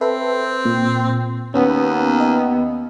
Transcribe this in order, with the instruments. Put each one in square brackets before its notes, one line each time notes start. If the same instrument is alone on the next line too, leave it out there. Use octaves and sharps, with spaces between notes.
[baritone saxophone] C4 [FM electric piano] A4 B4 E5
[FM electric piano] A#2
[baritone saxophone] D#2 [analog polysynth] B3 [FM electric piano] C#4
[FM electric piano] D#5